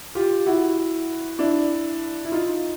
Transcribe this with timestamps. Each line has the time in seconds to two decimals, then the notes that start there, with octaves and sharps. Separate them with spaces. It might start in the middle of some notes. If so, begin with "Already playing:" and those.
0.15 F4 G4
0.46 E4 F#4
1.39 D4 E4
2.25 E4
2.32 D#4 F4